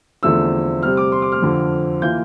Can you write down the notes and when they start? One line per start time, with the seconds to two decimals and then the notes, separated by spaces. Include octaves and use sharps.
0.23 E2 D3 F3 A3 C4 E6
0.82 C3 G3 C4 F6
0.97 D6
1.12 C6
1.22 D6
1.32 F6
1.42 F2 D3 F3 C4
2.02 E3 A#3 F4 G6